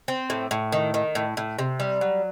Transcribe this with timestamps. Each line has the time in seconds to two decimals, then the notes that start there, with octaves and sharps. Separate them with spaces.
0.08 C4
0.30 A2
0.51 A2
0.72 D#3
0.94 D#3
1.15 A2
1.37 A2
1.59 C3
1.80 G3
2.01 F#3